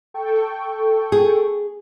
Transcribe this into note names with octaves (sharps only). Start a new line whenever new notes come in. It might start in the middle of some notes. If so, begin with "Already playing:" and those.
A4 G5 C#6
G#4